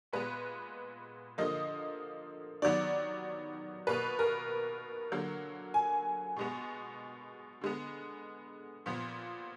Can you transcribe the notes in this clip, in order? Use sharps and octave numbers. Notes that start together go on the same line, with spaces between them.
A#2 G#3 B3 B4
D3 F3 A#3 D#5
D#3 F#3 B3 D5
B2 A#3 B4
A#4
D3 F#3 A#3
G#5
B2 G#3 B3
D3 G#3 B3
A#2 F3 B3